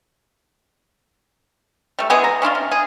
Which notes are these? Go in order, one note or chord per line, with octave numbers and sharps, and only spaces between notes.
G3 A3
E3 G#3 B3 G#4
A#5
C#4 D4 E4 F4
C3
G#4